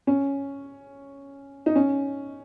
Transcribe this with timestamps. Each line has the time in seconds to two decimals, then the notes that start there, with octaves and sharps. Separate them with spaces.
0.07 C#4
1.66 D#4
1.76 C#4